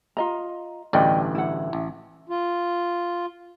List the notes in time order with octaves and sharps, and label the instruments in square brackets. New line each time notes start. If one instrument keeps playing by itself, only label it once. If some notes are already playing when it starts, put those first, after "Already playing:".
[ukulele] F4 D#5 A#5
[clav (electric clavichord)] A1 D2 G2 [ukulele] D5 D#5 G5
[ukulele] E4 F#5
[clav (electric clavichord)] A1
[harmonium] F4